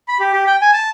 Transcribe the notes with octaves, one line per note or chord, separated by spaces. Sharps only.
B5
G4
G4
G5
G#5
A5